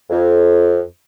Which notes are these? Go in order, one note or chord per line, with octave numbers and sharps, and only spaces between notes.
F2